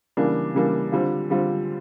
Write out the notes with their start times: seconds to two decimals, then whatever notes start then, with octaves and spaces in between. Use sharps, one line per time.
0.17 C#3 E3 G3 A#3 D4
0.55 C#3 E3 G3 A#3 D4
0.92 D3 G3 C4 F4
1.30 D3 G3 C4 F4